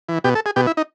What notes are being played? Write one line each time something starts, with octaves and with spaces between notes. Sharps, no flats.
E3
B2 G4
A4
G#4
B2 G4
E4
D#4